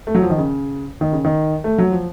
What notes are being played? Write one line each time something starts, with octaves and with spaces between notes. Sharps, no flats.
A3
F#3
F3
D#3
C#3
D#3
C#3
D#3
A3
F#3
F3